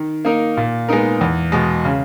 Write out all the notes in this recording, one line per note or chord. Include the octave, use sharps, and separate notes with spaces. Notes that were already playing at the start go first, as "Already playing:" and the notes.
Already playing: D#3
A#3 D#4 A#4
A#2
G#3 B3 D#4 A#4
E2
B2 G#3
C#3